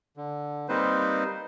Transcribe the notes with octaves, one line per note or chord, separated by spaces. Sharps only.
D3
G3 A#3 C4 D#4 B4 C5